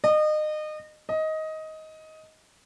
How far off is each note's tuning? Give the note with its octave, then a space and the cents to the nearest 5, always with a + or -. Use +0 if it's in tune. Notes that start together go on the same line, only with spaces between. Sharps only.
D#5 -30
D#5 +15